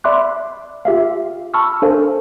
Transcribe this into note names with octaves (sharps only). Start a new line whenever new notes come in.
D5 E5 B5 C6 D6 F#6
F4 G4 E5 F5
A5 B5 C#6 E6 F6
D4 A4 A#4 C5 F5 G#5